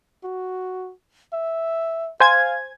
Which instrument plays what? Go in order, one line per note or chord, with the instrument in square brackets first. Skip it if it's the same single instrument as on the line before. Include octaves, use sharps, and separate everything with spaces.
[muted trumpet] F#4
E5
[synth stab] C5 G#5 G#6 [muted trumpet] F5